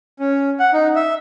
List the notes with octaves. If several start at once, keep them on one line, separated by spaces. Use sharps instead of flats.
C#4
F#5
D#4
E5